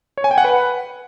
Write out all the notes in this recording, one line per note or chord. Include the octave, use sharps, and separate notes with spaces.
C#5
G#5
G5
F#5
B4